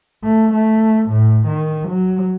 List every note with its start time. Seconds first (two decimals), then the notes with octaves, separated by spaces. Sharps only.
0.24 A3
0.53 A3
1.09 A2
1.48 D#3
1.88 F#3